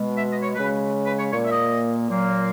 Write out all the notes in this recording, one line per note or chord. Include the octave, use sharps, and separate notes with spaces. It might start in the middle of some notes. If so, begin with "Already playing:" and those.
Already playing: B2 G#3
E5
D#5
C#5
C#3 G#3 B4
B4
C#5
A#2 A#3 C#5
E5
D#5
A#2 F#3 A#3